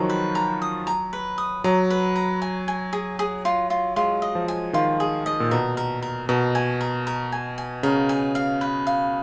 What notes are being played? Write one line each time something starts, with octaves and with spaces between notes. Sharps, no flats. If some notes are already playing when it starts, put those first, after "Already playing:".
Already playing: D#3 F3 F#3 F4 F#4 A#5
B4
A#5
D#6
A#5
B4
D#6
F#3 A#5
B4
A#5
G#5
G#5
G#4
G#4
F4
F4
G#3 F4
D#5
F3
G#5
D#3 F4
G#4
D#5
A#2
B2 A#4
A#4
A#4
B2 A#4
G#5
A#4
A#4
G#5
G#5
C#3 A#4
G#5
F5
B4
F5